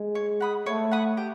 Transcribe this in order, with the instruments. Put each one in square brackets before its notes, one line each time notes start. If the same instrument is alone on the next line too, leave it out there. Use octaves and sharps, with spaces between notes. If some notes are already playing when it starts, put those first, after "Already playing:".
Already playing: [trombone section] G#3
[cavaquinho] C#5
F#5 B5 D#6
[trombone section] A3 [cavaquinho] C#5
[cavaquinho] F#5 B5 D#6
G4